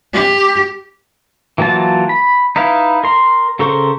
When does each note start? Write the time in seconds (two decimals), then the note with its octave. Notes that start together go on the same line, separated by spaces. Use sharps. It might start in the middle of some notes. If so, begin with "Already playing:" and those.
0.13 G4
1.58 E3 F#3 A#3 F4 A5
2.09 B5
2.56 D#4 E4 B4 F5
3.04 A#4 C6
3.59 C#3 A4 A#4 C5 C#6